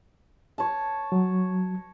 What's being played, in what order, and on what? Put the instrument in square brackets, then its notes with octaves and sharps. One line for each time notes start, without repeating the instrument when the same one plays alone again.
[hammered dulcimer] C#5 A5
[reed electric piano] F#3